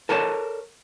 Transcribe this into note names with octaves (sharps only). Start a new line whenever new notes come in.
A4 A#4 C#5 D5 G#5 A5